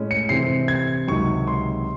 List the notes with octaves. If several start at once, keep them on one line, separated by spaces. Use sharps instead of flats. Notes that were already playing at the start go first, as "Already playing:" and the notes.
Already playing: A2 G#3 C#4 E4
C#7
C3 E3 C4 E4 C7
G#6
C#2 C3 D#3 F#3 C#6
C6